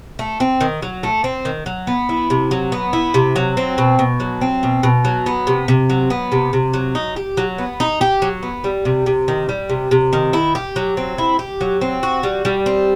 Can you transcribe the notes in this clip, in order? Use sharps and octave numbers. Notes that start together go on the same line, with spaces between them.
A3
C4
D#3
F#3
A3
C4
D#3
F#3
B3
E4
C3
F#3
B3
E4
C3
F#3
C4
B2
B2
F#3
C4
B2
B2
F#3
B3
C3
C3
F#3
B3
C3
C3
F#3
D#4
G4
F#3
B3
D#4
G4
F#3
B3
G3
C3
C3
D#3
G3
C3
C3
D#3
E4
G4
F#3
C4
E4
G4
F#3
C4
F#4
G3
G3
C4